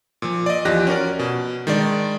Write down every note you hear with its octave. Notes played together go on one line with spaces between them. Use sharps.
A#2 F3
D5 D#5
E2 F3 G4 F#6 A#6
C#4 F#4 A#4 D5
B2
D#3 G#3 D4 D5